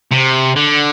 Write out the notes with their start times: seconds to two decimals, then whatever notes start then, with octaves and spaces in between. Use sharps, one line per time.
0.12 C3
0.56 D3